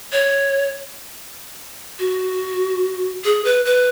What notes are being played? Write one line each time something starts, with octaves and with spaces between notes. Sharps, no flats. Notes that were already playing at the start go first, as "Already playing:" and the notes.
C#5
F#4
G#4
B4
B4